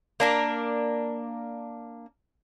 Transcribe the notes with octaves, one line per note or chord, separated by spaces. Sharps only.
A#3 D4 A#4